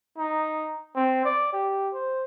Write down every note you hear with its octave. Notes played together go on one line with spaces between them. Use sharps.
D#4
C4
D5
G4
C5